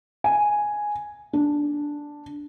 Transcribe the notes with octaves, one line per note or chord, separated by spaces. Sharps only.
G#5
D4